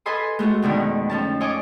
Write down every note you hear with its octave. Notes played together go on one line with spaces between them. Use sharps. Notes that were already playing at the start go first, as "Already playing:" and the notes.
A4 B4 D#5 G#5 C6 D#6
G#3 A3 F4 F#4
F2 B2 D3 D#3
F3 C#4 A5
C#5 D#5 G#5 C#6 D6